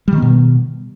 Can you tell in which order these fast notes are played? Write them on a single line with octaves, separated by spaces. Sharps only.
G3 D#3 B3 B2